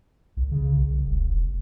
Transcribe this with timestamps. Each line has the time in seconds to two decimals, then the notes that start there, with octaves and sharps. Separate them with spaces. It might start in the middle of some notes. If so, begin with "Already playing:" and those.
0.37 C2
0.52 C#3
0.78 C2
1.06 E1
1.29 F1